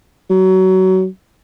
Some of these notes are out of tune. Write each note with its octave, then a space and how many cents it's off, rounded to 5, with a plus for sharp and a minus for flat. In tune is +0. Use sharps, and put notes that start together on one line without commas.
F#3 +25